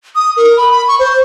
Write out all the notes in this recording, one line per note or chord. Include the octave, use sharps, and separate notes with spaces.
D#6
A#4
B5
B5
C#6
C5